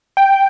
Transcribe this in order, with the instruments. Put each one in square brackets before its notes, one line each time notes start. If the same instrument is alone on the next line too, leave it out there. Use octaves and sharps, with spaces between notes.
[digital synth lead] G5